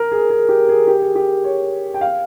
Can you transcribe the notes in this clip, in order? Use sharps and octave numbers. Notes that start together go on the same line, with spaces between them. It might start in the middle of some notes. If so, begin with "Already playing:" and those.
Already playing: A#4
G#4
G#4
G4
G#4
G4
G#4
G4
C#5
G5
F5